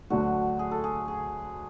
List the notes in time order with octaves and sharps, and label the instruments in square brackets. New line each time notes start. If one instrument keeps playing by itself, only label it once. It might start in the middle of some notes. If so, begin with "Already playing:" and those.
[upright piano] D2 D3 F#3 A3 D4 [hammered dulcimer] F#4
[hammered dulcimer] G#4
A4
G#4
G#4